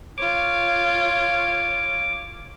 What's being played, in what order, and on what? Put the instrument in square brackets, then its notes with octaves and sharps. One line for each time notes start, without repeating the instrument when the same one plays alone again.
[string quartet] F4 C#5 [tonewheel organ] D6